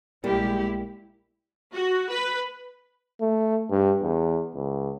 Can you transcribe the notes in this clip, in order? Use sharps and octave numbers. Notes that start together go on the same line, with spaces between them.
B1 G3 G#3 A#3 E4 G4
F#4
B4
A3
G2
E2
C#2